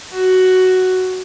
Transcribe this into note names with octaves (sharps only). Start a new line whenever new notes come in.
F#4